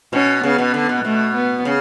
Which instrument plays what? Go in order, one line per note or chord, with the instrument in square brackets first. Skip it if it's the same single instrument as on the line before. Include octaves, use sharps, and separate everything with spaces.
[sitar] B2 [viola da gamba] C#4
[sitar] C#3 [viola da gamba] B3
[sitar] B2
D3
B2
[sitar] B2 [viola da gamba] A3
[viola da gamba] B3
[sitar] C#3